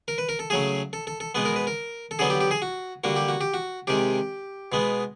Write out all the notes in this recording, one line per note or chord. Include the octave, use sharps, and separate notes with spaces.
A#4
B4
A#4
A4
C#3 F#3 A3 G#4
A4
A4
A4
B2 G#3 B3 B4
A#4
B4
A#4
A4
D3 F#3 B3 G#4
G4
G4
G#4
F#4
D3 G3 A#3 F#4
G4
F#4
G4
F#4
C3 D#3 G#3 G4
B2 G#3 B3